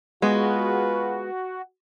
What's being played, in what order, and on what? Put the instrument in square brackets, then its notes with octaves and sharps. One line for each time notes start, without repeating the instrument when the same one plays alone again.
[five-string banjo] G#3 B3 [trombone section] F4 G#4 B4 [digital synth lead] F#4